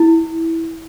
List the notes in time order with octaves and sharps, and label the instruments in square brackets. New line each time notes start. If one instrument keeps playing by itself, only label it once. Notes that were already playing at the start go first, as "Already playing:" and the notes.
Already playing: [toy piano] E4